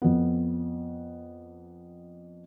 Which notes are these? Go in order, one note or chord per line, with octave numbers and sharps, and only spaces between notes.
F2 B3